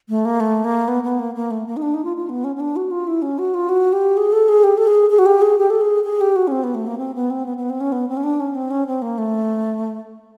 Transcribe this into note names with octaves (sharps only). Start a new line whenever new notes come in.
A3
A#3
A3
A#3
B3
B3
A#3
A#3
A3
A#3
D#4
D4
D#4
F4
F4
B3
C#4
C#4
D4
F#4
F4
E4
C#4
F#4
F4
F#4
G4
G#4
A4
G#4
G4
A4
G#4
G#4
F#4
G4
G#4
G4
A4
G#4
G#4
G4
F#4
C#4
C4
B3
A3
A#3
C4
B3
C4
B3
B3
C4
C#4
B3
C4
C#4
D4
C#4
C4
C#4
C4
A#3
A3